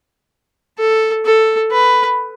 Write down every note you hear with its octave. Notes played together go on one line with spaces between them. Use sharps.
A4
A4
B4